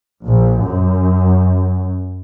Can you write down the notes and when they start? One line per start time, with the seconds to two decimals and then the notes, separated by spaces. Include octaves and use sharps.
0.25 A#1
0.63 F#2